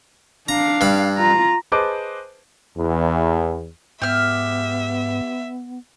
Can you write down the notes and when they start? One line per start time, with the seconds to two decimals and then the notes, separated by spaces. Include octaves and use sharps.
0.48 D4 F5 A#5
0.81 G2 B5
1.17 F4 A#5
1.72 G#4 B4 C5 D#5 A5 D6
2.77 E2
4.02 G#2 B3 G4 E5 F6